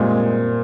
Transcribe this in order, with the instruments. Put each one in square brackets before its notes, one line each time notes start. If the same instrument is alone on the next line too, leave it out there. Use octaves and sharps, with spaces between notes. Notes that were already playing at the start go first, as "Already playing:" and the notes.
Already playing: [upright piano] A#2 G3 C4 [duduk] G#3